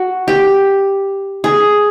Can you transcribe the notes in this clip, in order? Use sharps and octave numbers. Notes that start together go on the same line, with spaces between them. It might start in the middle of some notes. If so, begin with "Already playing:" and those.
Already playing: F#4
G4
G#4